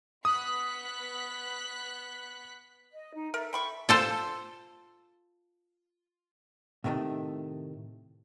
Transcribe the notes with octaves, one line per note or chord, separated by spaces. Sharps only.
B3 D#6 F#6 B6
D#5
D#4
A4 A#4 E5
G5 B5 C#6
F4 A4 C5
A2 C3 D#3 G3 A3